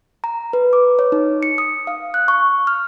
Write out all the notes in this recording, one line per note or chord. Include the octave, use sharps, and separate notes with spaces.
A#5
B4
D6
C#5
D#4
C#7
D#6
F5
F#6
C#6
F6